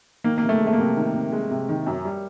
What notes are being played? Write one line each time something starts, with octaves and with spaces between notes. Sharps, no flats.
D#3 A#3
C3 A#3
A3
G#3
A3
A#3
C3
D#3
C3
G#3
C3
D#3
F#2
G3